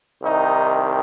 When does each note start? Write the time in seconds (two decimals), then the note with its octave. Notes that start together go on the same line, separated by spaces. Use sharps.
0.23 C2 C3 D#3 D#4